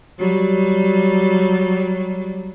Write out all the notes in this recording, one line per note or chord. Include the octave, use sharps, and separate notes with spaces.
F#3 G3